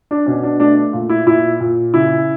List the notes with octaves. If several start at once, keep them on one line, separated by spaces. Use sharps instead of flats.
D4
B2 C#4
D4
A3 D4
A#2 F4
E4
A#2 E4
A#2
C#3 E4